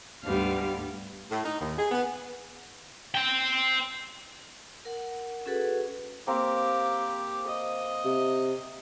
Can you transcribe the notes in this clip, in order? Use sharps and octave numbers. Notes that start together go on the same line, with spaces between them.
D2 G#2 G3 B3 F5
A2
D#4
D#2
G#4
B3
C5 G5
A#4 F#5
C#4 F#4 G#4 A4 B4 F#5
A#3 C4 G4 A#4
D#5
C3